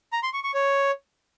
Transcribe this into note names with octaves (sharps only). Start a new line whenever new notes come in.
A#5
C6
C#6
C#6
C#5